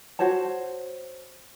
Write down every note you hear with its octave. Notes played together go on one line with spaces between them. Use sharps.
F#4 C5 C#5 A5